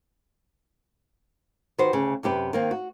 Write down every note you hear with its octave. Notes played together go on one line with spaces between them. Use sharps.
D#3 F#4 G4 B4 C5
D2 C#3
F#2 C3 G4 B4
D#3 A#3 C4
F#4